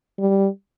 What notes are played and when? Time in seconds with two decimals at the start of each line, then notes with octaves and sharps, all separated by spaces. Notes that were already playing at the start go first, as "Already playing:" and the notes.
0.19 G3